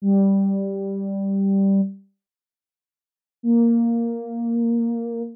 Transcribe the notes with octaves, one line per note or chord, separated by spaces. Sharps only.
G3
A#3